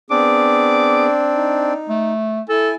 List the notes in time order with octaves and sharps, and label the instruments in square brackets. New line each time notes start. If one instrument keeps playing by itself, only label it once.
[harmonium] B3 G#4 [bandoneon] C4 D4 [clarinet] D6
[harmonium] D#4
[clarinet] A3
[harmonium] E4 G#5 [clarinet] A4